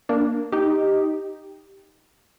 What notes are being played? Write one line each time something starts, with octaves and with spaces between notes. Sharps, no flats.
A#3 D4
D#4 G4